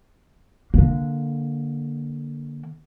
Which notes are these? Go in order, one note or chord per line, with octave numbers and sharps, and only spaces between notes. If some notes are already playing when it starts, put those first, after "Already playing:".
D3 A#3